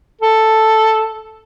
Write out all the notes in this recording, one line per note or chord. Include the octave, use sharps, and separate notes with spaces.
A4